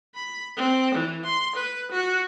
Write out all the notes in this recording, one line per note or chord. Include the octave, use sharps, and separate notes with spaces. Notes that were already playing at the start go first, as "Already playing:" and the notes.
B5
C4
E3
C6
B4
F#4